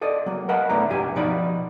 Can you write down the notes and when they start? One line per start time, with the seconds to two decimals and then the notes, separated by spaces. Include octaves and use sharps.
0.01 A4 D5 D#5
0.26 F#3 A#3
0.49 A#4 D#5 F5 F#5 A5 B5
0.69 A2 D3 A3 B3 D5 A#5
0.90 C2 G2 F#3 G4 G#5
1.15 B2 F3 D#4 D5 B5